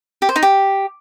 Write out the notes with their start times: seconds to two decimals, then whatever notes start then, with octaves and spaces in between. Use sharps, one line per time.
0.22 G4
0.29 C5
0.36 D#4
0.43 G4